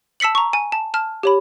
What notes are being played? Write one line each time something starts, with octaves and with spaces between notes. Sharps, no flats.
A5 E6 B6 C#7 F#7
A#5 C#6
G#5
A5
A5 F6
G4 C#5 B5